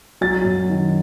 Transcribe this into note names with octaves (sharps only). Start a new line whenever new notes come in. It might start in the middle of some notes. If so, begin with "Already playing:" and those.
F#3 A6
F#2
D#3